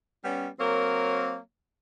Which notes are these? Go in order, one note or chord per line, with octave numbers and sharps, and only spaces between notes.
G3 B3 C#4
F#3 A#3 C4 A#4 C#5